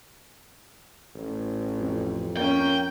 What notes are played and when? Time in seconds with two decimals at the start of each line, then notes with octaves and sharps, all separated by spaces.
1.15 A1
1.78 F2
2.37 A#3 C#4 G5